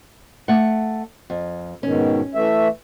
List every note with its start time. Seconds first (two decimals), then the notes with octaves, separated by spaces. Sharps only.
0.48 A3 F#5
1.30 F2
1.83 G#2 B2 D#3 C#4
2.35 E3 A3 E5